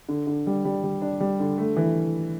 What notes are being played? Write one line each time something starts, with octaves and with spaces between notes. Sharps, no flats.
D3
D3
G3
G3
G3
D4
G3
D3
A3
E3